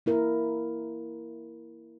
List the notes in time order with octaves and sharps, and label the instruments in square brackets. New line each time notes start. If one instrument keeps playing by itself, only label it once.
[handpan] A#3 E4 A#4